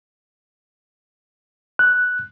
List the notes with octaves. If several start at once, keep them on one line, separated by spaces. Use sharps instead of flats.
F#6